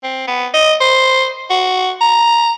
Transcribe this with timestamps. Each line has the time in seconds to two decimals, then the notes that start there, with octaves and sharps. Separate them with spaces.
0.03 C4
0.27 B3
0.54 D#5
0.81 C5
1.50 F#4
2.01 A#5